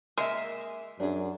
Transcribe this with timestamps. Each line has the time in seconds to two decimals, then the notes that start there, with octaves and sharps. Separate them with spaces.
0.18 G#3 A#3 A#4 E5
1.00 F#2 D4 G#4